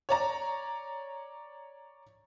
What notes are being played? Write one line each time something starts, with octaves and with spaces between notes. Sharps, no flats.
C#5 D5 A#5